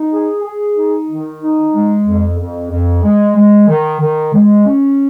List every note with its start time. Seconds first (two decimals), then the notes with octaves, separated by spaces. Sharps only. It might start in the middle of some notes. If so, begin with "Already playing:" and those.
Already playing: D#4
0.11 G#4
0.44 G#4
0.76 D#4
1.09 D#3
1.41 D#4
1.73 G#3
2.06 F2
2.38 F2
2.70 F2
3.03 G#3
3.35 G#3
3.68 D#3
4.00 D#3
4.33 G#3
4.66 C#4